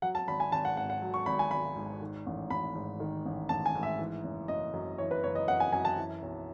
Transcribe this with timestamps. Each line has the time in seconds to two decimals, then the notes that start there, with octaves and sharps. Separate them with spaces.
0.02 F#3 F#5
0.15 A5
0.28 G#1 B5
0.40 G#5
0.52 G#1 A5
0.65 F#5
0.76 G#2 F#5
0.90 F#5
1.02 F#3
1.14 C#6
1.26 G#1 B5
1.39 G#5
1.51 G#1 B5
1.76 G#2
2.01 D#3
2.26 A1
2.50 A1 B5
2.75 G#2
3.00 D#3
3.25 A1
3.49 A1 A5
3.66 G#5
3.75 G#2
3.83 E5
3.99 E3
4.24 F#1
4.48 F#1 D#5
4.73 F#2
4.98 E3 C#5
5.11 B4
5.24 F#1 C#5
5.35 D#5
5.48 F#1 F#5
5.60 G#5
5.73 F#2 G#5
5.85 A5
5.98 E3
6.22 B1